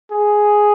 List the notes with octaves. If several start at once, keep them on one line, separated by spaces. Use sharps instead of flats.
G#4